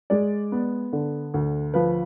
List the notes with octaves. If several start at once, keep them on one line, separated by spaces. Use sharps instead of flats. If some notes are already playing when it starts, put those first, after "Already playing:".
G#3 D5
B3
D3
D2
F3 B4